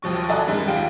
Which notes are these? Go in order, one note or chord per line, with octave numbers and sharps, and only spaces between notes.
D#2 F3 F#3 C#6
A4 D5 D#5 G#5 A#5 F#6
F#2 D#3 G3 G#3
D#2 F4 G4 D7